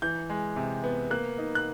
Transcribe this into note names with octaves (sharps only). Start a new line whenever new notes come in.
E3 G6
G#3
C3
B3
A#3 F#6
D#4
F#6